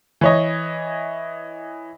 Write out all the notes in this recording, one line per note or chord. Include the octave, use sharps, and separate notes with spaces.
E3 C#5 D#5